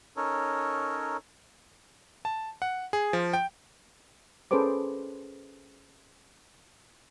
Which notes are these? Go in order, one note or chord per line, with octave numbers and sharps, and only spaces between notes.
C#4 D#4 A4 A#4 C#5
A5
F#5
G#4
F3
G5
C#4 G#4 A4 B4 C5 D6